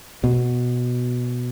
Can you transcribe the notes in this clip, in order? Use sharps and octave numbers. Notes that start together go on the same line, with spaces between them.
B2